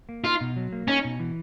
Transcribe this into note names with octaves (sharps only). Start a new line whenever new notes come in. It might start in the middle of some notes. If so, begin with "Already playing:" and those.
A#3
D#4 F4
B2
F#3
A#3
C#4 D#4
B2
E3